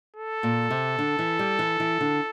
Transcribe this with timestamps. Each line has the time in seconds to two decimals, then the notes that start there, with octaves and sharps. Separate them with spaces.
0.16 A4
0.43 A#2
0.71 C3
0.99 D3
1.19 E3
1.39 G3
1.59 E3
1.80 E3
2.01 D3